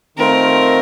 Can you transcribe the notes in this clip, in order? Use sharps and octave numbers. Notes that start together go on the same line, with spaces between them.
D#3 A3 C4 F4 A#4